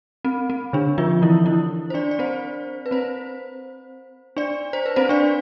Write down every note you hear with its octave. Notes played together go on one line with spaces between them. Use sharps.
C4
C4
D3 D4
F3 F4
E3 E4
E3 E4
C5
D4 D5
D5
C4 C5
B4
C4 C5
D4 D5
C5
B4
C4 C5
D4 D5